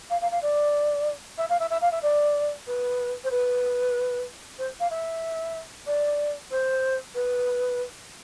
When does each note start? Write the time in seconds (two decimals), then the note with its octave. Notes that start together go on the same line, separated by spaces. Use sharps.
0.10 F5
0.21 F5
0.31 F5
0.42 D5
1.38 E5
1.50 F5
1.60 E5
1.70 E5
1.81 F5
1.92 E5
2.03 D5
2.67 B4
3.24 C5
3.31 B4
4.59 C5
4.80 F5
4.91 E5
5.87 D5
6.51 C5
7.15 B4